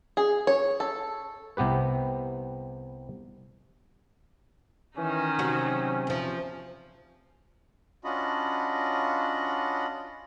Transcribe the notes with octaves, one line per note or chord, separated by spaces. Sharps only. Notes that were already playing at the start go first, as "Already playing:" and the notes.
G#4
C#5
A4
C2 C3 B3 G4 B4
D#3 E3 C#4 D#4
C3 F#3 F#4
E2 F3
C#4 D4 F4 F#4 D#5 B5